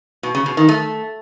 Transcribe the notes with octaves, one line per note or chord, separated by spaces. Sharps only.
B2
C#3
B2
D#3
A3